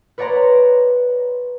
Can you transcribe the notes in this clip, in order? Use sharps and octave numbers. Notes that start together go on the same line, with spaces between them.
B4 C#5 D5 F#5 A#5 C6